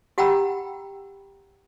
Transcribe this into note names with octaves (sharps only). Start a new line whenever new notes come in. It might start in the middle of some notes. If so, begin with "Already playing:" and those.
G4 F#5 G5 A#5 B5 E6